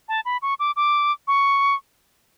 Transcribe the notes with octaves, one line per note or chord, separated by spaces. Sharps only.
A5
B5
C#6
D6
D6
C#6